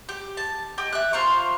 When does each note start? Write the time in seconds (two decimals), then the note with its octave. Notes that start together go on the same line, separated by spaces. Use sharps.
0.09 G4
0.37 A5
0.78 G4 D#5 G5
0.93 E5 F#6
1.13 F4 C5 A#5 C#6